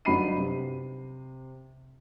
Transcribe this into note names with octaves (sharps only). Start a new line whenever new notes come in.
G1 F#3 D#4 B5 C7 D#7
C3